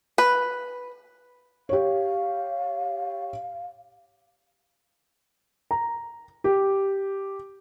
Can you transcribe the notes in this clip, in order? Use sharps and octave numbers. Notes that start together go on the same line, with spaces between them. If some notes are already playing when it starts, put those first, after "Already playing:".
B4
G4 C#5 F5
A#5
G4